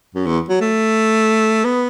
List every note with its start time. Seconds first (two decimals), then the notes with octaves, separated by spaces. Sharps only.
0.15 F#2
0.26 E2
0.49 F#3
0.61 A3
1.65 B3